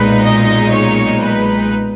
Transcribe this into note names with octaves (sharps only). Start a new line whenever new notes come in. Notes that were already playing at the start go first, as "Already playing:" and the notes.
Already playing: B1 A#2 G#3 D#4 B4
D#5
C#5
B4